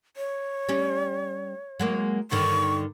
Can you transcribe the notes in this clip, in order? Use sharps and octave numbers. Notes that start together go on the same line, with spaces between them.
C#5
G3 C#4
F#3 G#3 A#3
G2 D3 D#3 C#6